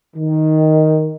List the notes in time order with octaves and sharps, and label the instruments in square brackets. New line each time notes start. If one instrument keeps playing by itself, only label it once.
[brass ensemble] D#3